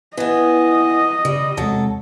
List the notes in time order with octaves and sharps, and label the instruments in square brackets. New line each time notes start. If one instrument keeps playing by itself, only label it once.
[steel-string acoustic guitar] E3 B3 [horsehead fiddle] D#5
[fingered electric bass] C#3 [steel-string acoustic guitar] G3
[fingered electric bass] E2 C3 G#3 [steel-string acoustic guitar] F#3 A4